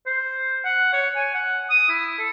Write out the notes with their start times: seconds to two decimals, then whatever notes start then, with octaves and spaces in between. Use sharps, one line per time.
0.06 C5
0.65 F#5
0.93 C#5
1.16 G#5
1.34 F#5
1.70 D#6
1.89 E4
2.19 A4